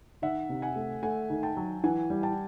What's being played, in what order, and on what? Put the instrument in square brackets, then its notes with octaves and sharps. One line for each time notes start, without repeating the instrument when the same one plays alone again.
[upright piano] D#3 [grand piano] E5 F#5
[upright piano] C3
[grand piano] F#5 G#5
[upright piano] A3
[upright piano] A3 [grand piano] F#5 G#5
[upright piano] D#3
[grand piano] G5 A5
[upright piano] F#3
[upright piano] E3 [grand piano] F#5 G#5
[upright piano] G3
[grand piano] G5 A5